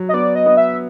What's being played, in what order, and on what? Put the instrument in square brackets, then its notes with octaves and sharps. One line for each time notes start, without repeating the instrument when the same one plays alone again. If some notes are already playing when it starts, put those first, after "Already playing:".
Already playing: [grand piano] F#3
[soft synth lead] D#5
[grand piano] B3 [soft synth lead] D5
[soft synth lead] D#5
[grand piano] B3
[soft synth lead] E5